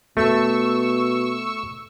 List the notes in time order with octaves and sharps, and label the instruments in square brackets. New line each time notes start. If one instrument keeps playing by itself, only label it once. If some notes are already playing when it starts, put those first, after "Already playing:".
[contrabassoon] B2 [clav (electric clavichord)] A3 [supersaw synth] C#6 E6